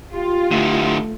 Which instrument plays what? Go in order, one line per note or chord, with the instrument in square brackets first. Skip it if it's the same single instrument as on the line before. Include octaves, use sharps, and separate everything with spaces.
[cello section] F4 [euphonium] G4
[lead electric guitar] D3 E4 [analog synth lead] A3